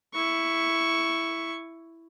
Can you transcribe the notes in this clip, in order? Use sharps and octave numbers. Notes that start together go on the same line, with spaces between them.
E4 C#6